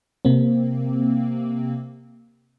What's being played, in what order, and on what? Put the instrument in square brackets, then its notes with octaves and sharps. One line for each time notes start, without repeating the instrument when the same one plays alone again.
[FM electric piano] C3 A#3 C4